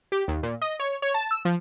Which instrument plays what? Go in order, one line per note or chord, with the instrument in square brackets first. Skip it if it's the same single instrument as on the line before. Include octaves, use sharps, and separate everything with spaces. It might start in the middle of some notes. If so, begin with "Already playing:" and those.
[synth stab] G4
D#2
A#2
D#5
C#5
C#5
A5
E6
F3